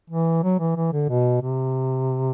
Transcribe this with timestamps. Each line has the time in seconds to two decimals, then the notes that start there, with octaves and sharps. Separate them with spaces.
0.10 E3
0.43 F#3
0.60 E3
0.76 E3
0.93 D3
1.09 B2
1.42 C3